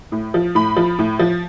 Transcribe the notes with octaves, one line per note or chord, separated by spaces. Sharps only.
A2
F3
A2 B5
F3
A2
F3